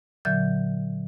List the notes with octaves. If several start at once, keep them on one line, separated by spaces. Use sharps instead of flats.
A#2 D3 F#3 E5 G6